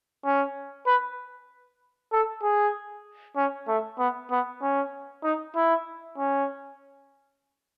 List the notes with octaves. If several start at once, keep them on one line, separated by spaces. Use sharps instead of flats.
C#4
B4
A4
G#4
C#4
A3
B3
B3
C#4
D#4
E4
C#4